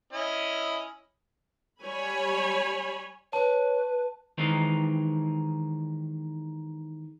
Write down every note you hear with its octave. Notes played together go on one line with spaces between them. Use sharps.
C#4 E4 D#5
G3 C#5 G#5 B5
B4 C#5 A5
D#3 E3 G#3 C4 D#4